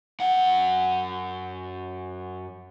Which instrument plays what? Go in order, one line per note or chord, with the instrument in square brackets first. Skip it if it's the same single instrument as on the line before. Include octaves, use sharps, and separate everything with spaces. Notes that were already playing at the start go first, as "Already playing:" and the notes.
[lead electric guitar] F#2 F#5